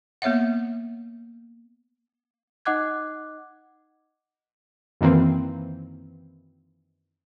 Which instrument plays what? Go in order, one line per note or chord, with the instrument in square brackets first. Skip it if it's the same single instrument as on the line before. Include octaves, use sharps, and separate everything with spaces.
[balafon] A#3 B3 C#5 E5 F#5
[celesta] D#4 D#5 F#5 D6 F#6 G#6
[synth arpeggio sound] F#2 D#3 E3 A#3 C4